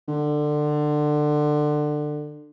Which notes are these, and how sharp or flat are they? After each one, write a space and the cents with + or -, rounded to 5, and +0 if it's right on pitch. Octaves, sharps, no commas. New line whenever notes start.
D3 +25